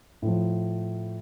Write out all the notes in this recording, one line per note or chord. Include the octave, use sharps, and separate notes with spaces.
A2 F3